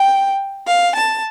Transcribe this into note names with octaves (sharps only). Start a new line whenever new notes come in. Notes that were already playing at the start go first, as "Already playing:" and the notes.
Already playing: G5
F5
A5